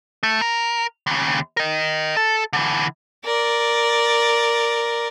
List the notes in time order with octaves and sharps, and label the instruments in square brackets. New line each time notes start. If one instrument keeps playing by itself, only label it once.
[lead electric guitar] A3
A#4
D#2 C#3
A#4 D#5
A4
D3 E3
[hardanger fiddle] A#4 D5